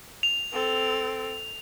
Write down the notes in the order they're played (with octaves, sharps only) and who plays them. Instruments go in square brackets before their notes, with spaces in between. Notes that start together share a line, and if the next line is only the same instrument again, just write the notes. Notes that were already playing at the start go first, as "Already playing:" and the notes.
[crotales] F7
[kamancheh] C4 A4